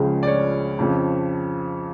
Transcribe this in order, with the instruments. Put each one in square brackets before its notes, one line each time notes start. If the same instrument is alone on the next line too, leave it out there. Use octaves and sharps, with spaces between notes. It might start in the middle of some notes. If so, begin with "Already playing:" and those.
Already playing: [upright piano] C#2 C#3 F3 G#3
D5
C#5
F2 C#3 F3